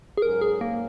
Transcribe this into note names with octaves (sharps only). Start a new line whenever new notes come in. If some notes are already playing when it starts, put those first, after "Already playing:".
G#4
G#2 F#3 C#4 A#4
G#4
A#3